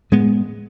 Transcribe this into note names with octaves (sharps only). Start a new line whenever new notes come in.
A2 G#3 B3